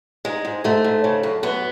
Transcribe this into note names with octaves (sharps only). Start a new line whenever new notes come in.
G#2 G#3
G#2
G#2 A3
G#2
C#3
F#2
F#2 B3